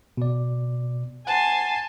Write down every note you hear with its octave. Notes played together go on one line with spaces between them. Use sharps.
B2 D5
F#5 G#5 A5 C6